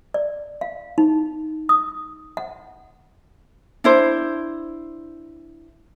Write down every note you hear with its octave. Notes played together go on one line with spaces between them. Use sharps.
D5
F5
D#4
D#6
F#5
D4 E4 C5